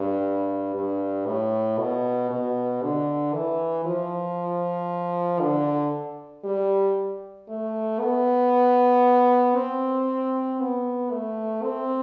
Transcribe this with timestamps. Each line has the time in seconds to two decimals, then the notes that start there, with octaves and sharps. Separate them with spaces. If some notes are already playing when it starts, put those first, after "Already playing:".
Already playing: G2
0.75 G2
1.26 A2
1.78 B2
2.30 B2
2.82 D3
3.33 E3
3.85 F3
5.41 D3
6.44 G3
7.49 A3
8.00 B3
9.55 C4
10.60 B3
11.11 A3
11.63 C4